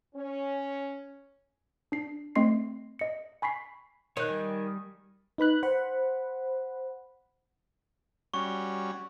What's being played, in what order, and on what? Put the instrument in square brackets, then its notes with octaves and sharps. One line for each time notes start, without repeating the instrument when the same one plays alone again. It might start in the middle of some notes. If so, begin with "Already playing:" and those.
[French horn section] C#4
[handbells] D4 C7
A3 C4 D#5 C6 C7
D#5 C#7
G#5 B5 C#6 B6 C7
[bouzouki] D#3 [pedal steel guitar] C#5 F#6
[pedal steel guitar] G3 G#5
[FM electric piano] D#4 B4 B5 F#6
C5 F#5 B5
[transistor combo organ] G3 C#4 F#4 [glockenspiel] C#6